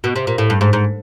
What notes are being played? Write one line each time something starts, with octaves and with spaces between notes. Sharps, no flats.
B2
C3
A#2
A2
G2
G#2
G#2